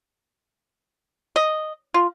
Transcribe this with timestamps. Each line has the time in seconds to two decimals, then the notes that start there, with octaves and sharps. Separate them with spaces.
1.36 D#5
1.94 F4